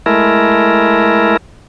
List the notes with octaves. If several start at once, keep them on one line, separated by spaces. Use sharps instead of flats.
G#3 A3 E4 A#4